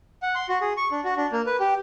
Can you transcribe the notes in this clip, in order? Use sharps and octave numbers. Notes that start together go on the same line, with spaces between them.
F#5
C6
F#4
G#4
C#6
D4
F#4
D4
A#3
B4
G4